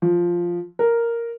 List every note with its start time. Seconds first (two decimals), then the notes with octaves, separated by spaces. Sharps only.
0.02 F3
0.79 A#4